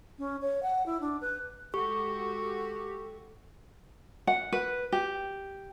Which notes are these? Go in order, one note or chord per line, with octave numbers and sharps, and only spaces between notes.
C#4
C#5
F#5
E4
D4
B4
G#3 F#4 G4 A4 C#6
F#5
B4
G4